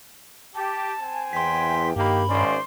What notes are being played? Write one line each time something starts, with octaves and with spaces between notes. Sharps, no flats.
G4 A5
C4 G#5
E2 G5 C6 B6
G2 D#3 A#3 G4 B5
G#1 C#4 C5 D5 C6